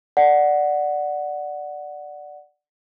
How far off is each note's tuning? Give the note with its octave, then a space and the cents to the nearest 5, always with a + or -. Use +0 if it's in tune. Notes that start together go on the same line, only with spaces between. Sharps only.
D5 +5 F#5 +0